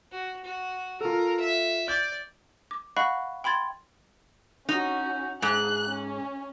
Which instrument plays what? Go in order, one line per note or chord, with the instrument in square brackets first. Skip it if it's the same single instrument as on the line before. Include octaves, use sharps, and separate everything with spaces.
[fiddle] F#4
F#4
[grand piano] F4 A4 [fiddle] A#4
[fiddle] E5
[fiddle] D5 [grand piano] G6
[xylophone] D6
D#5 F5 F#5 B5 C#6 F#6
G5 B5 C6 G#6 A6
[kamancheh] C#4 F#4 [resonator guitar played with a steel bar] D#4
[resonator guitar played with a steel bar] G#2 [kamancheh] G#4 F#6
[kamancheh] C#4